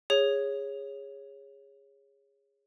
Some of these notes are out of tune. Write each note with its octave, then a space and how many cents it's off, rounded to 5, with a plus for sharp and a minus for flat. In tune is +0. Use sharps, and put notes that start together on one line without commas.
G#4 -20 C#5 -5